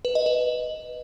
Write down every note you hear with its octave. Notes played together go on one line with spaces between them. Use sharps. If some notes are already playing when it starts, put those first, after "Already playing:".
B4
D#5
B4